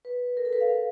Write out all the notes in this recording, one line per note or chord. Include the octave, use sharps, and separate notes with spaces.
B4
A#4
A4
B4
F5